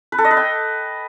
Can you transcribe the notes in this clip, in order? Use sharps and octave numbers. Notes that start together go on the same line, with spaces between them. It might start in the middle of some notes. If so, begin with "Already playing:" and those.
B4
A4
D#5
B4
G5